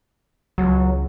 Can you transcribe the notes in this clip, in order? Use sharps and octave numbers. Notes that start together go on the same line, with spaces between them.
C#2 F#3